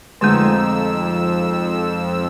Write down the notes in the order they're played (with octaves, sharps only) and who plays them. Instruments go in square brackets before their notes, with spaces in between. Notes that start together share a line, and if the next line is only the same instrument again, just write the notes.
[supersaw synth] F2 E6 [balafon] D3 A3 [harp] G#3 D#4 G#4